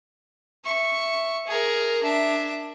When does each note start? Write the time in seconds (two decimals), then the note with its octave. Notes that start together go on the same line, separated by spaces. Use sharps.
0.64 E5 C#6
1.47 G#4 A#4
2.03 D4 E5